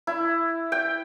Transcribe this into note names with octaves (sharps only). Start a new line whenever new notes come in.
E4
G5